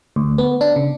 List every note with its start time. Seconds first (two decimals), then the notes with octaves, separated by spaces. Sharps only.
0.16 D2
0.38 B3
0.61 D4
0.76 C#3